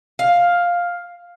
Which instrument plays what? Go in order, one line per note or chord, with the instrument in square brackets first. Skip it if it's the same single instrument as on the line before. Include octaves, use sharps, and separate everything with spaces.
[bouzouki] F5